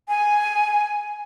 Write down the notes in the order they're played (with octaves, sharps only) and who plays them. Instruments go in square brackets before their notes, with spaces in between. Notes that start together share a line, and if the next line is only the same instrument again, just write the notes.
[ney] G#5